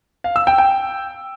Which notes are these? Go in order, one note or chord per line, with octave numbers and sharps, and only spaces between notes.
F5
E6
G5
G5